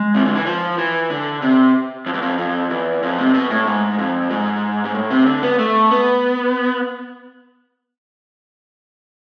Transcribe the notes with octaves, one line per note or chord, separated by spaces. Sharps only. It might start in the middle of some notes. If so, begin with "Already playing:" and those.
Already playing: G#3
C3
D3
E3
F3
E3
D3
C3
F2
E2
F2
F2
E2
F2
C3
B2
A2
G#2
F2
G#2
G#2
A2
C3
D3
B3
A3
B3